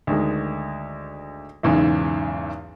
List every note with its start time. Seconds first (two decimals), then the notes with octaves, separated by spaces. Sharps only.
0.07 D2 D#3 G#3
1.63 B1 E2 G#2 C#3